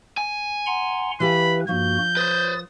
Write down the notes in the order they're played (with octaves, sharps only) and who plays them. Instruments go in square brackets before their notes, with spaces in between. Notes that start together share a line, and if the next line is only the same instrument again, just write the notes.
[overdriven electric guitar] G#5
[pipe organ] F#5 A#5 C6
[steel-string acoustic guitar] E3 G4 F5 [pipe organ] B4 [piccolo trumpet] B5
[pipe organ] G2 A#3 F#4 [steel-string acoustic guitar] F3 [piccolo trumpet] G6
[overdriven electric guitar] B4 C5 [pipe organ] D#6 A6